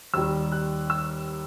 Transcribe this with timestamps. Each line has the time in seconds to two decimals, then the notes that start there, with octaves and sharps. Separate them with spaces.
0.14 D#2 D#3 G3 E6
0.52 F#6
0.90 E6